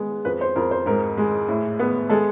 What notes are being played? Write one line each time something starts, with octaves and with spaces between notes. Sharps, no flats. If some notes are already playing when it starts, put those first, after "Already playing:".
Already playing: G#3 B3
F2 B4
C5
F2 A#4
C5
G#2 A#4
G#3
A2
B3
G#3 A4